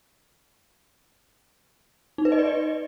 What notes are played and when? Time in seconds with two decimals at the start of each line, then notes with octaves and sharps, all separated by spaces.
2.18 D#4
2.25 B4
2.32 D#5
2.39 D5
2.46 D#5